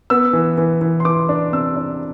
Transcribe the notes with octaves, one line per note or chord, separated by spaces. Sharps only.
B3 E6
E3
E3
E3
C6
E3 D6
D4
C3 E6
D4